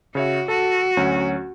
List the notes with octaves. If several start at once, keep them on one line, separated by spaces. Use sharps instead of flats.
C#3 F#4 C#5 E5
F#4 A4 A5
D2 F#3 C#4